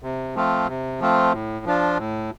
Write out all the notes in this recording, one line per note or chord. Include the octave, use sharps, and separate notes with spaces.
C3
F3 A3 C4 F4
C3
F3 A3 C4 F4
A2
F3 D4 F4
A2